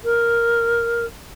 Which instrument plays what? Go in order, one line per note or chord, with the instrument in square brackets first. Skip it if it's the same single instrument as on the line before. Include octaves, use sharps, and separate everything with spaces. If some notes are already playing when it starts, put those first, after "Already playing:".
[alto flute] A#4